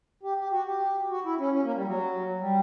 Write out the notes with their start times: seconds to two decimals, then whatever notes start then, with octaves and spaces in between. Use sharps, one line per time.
0.23 G4
0.38 G4
0.52 F#4
0.66 G4
1.10 F#4
1.25 E4
1.39 C#4
1.53 C#4
1.64 A#3
1.75 G3
1.85 F#3
2.40 G3